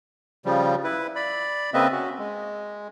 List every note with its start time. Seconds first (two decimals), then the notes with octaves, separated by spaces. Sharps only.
0.45 C#3 F3 G3
0.84 E4 B4
1.15 D5 B5
1.74 C#3 A#3 C4 B4 D#5 E5
1.92 C#4 F#4
2.19 G#3